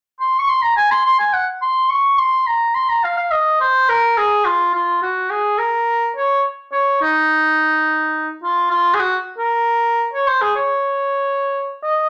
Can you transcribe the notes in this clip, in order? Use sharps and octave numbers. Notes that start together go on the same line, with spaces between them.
C6
C#6
C6
A#5
G#5
C6
C6
G#5
F#5
C6
C#6
C6
A#5
C6
A#5
F5
F5
D#5
C5
A#4
G#4
F4
F4
F#4
G#4
A#4
C#5
C#5
D#4
F4
F4
G#4
F#4
A#4
C#5
C5
G#4
C#5
D#5